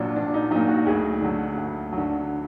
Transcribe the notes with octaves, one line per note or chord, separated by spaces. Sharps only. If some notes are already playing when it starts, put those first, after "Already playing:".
Already playing: A#1 A#2 F#3 D4 F4
A#1 D4
D#4
A#2 F#3 D#4
F#4
D2 G#4
D3 F#3
D2
D3 F#3